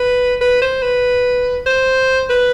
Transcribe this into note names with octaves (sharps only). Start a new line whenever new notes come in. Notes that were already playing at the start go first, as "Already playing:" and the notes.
Already playing: B4
B4
C5
B4
C5
B4